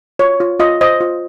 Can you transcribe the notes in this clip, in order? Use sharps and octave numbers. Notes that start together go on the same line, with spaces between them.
F4 C#5
F4
F4 D#5
C5 D#5
F4